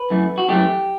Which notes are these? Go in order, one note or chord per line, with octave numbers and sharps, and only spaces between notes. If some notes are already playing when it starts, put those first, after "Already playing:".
Already playing: B4
F#2 E3 A3
F#4
F#2 E3 A3 G4